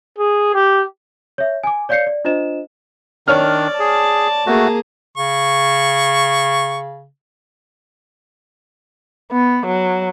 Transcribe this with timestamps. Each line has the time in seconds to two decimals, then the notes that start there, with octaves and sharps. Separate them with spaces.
0.19 G#4
0.54 G4
1.38 C#5 E5
1.64 G#5 D6
1.89 C#5 D5 F5 G6 C7 C#7
2.06 D5
2.25 D4 F4 C5 D#5 E7
3.28 D#3 D4 C#5 D5 F6
3.79 G#4 A5
4.47 A3 A#3 F#4 G#4
5.18 C#3 C#6
9.32 B3
9.66 F#3